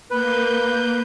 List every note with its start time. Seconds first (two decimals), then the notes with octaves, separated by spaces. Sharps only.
0.11 A#3 B4 G6